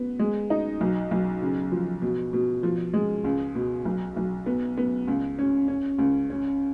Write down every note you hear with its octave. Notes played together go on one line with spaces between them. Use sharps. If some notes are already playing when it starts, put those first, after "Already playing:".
Already playing: B3
G#3
D#4
B1
B1
C#3
F3
B2
B2
F3
G#3
C#2
B2
B1
B1
B3
B3
C#2
C#4
C#4
C#2
C#4